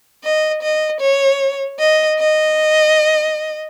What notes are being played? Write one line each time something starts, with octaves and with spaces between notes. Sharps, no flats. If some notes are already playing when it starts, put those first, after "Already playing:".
D#5
D#5
C#5
D#5
D#5